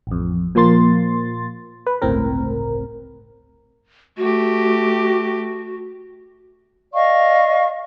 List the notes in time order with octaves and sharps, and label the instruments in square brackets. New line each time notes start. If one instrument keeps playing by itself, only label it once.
[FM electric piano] A1 F2
A#2 F3 A#3 C6 A6
B4
G1 C#2 A2 C4 A#4
[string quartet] A3 G4 [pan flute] F#4
[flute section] D5 D#5 F5 C#6